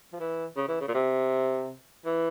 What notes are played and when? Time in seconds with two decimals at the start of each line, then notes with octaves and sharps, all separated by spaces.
0.13 F3
0.20 E3
0.56 C#3
0.68 E3
0.80 C#3
0.88 A#2
0.94 C3
2.05 E3